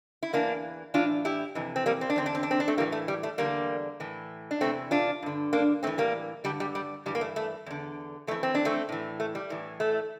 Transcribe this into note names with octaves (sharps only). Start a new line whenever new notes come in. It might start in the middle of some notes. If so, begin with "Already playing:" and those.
E4
E2 E3 A#3 D4
A2 E3 D4 F4
E4 G4
F2 C3 E3
C4
G3 A#3
C4
D4
E2 D3 C4
D4
C4
D4
C4
D4
A3 C4
A2 E3 G3 A#3
A3
G3
A3
E2 D3 G3 A#3
A2 E3
D4
E2 C3 E3 A3 C4
D4 F4
G2 D3
A#3 D4
A2 E3 A3 C4
G3 A#3
G2 D3 G3
G3
G3
G2 E3 G3
A#3
A3
A3
E2 D3
F2 E3 A3
C4
D4
A3 C4
A2 E3
A3
G3
A2 E3
A3